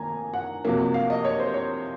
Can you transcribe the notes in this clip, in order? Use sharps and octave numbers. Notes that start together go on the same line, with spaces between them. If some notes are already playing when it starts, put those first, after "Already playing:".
Already playing: F1 F2 D#3 A#3 G#5 A#5
F#5
F2 C3 F#3 A#3
F5
D#5
C#5
C5
C#5